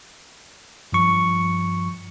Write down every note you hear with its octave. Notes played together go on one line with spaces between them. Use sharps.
G2 F3 C#6